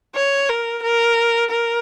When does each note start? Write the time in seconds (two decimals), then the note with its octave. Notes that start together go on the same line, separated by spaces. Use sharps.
0.16 C#5
0.49 A#4
0.83 A#4
1.51 A#4